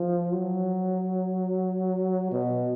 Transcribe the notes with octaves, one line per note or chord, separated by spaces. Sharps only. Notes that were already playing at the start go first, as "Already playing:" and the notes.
Already playing: F3
F#3
B2